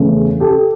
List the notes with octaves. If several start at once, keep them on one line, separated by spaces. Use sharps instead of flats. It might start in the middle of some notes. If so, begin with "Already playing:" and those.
Already playing: E2 C#3 E3 A3 C#4
G4 A4